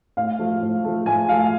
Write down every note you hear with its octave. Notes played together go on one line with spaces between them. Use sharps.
A2 F5
F3 A3
A2
F3 A3
A2 G#5
F3 A3 F5